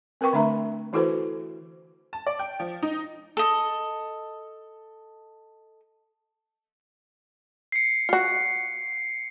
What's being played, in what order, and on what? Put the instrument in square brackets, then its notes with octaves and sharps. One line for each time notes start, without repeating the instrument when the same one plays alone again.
[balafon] C4 A#4 B4 G5 C#6
D3 A3 D4 E5 A#5
E3 E4 F#4 A4 B4 C5
[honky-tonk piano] A5
D5
G5
F3
D#4
[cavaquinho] A4 D#5
[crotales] C7 C#7
[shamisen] F4 F#4